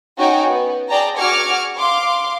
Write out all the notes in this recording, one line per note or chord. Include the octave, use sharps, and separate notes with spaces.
C#4 D#4 F#4 C#5 G5 G#5
B3
G#4 D5 G5 A5 A#5
F#4 G#4 D6 F6 G#6 C#7
F5 C6 D6